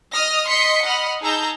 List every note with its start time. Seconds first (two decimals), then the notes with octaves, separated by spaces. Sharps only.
0.13 D#5 D#6 F6 A#6
0.49 D#5 C6 B6 C#7
0.83 D#5 F#5 B5 F6
1.22 D#4 G#4 A5 A#5 E6 G6